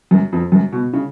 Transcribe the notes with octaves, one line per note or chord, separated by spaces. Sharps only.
F#2
F2
F#2
B2
C#3